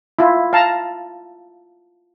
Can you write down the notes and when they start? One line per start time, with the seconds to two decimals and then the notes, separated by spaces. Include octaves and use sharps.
0.19 E4 F4
0.53 F5 A5 A#5